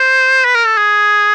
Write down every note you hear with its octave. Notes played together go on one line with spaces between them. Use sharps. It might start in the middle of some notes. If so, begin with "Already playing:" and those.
Already playing: C5
B4
A#4
A4
G#4